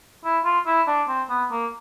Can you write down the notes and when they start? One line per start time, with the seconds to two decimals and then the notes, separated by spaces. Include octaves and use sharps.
0.24 E4
0.45 F4
0.66 E4
0.87 D4
1.08 C4
1.29 B3
1.51 A#3